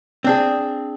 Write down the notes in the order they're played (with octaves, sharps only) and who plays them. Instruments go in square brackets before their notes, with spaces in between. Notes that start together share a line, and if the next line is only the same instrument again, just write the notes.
[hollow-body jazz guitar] C4 D4 G#4